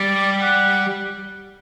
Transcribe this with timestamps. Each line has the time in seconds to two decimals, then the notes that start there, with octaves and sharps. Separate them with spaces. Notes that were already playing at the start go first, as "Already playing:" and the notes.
Already playing: G3 D5
0.42 F#5